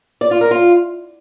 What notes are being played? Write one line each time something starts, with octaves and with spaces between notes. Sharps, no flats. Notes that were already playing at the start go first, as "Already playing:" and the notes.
D5
F4
A#4
F4